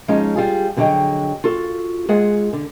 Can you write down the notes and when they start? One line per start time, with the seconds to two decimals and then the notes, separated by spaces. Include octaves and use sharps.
0.08 F3 G#3 C#4 D#4
0.36 G3 F4 G#4
0.76 F2 D3 F#3 G#4 D#5 G5
1.44 F4 F#4 A4
2.09 G#3 F4 G#4 F#5
2.53 D3